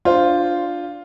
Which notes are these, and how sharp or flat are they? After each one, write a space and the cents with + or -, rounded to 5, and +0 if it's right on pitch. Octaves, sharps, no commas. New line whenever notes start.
D4 +0 F4 +0 C5 +0